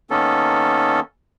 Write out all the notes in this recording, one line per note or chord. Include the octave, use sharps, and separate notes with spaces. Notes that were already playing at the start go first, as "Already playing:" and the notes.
D#3 A#3 B3 C#4 A4